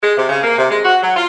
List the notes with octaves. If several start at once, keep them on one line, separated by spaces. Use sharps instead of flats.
G#3
C3
C#3
A#3
C3
G#3
F#4
F#3
F4